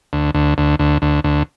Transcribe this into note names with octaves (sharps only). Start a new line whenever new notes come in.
D2
D2
D2
D2
D2
D2